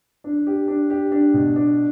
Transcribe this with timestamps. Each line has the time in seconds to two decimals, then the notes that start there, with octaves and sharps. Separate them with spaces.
0.24 D4
0.47 G4
0.68 D4
0.90 G4
1.12 D4
1.34 B2
1.56 D4